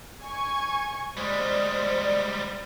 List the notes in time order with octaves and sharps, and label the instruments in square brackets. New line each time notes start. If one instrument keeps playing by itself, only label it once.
[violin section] G#5 C#6 G#6
[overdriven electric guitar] G3 G#3 [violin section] C5 D5